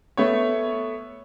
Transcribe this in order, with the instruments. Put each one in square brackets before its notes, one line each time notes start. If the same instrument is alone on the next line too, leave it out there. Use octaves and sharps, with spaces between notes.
[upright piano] A3 B3 C#5